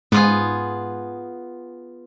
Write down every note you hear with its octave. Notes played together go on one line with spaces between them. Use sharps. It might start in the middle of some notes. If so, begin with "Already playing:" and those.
G#2 B3 F4 G#4